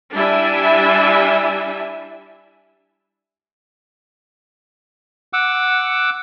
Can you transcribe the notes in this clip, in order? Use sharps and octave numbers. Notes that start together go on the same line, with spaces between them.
G3 D4 E4 E5 G#5
F#5 D6 E6